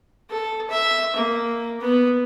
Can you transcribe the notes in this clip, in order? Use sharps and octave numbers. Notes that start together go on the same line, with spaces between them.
A4
E5
A#3
B3